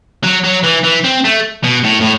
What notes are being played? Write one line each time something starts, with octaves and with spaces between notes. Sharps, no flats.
F#3
F#3
E3
E3
C4
A3
B2
A2
A2